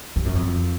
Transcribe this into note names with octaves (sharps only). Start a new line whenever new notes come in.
G2
F#2
F2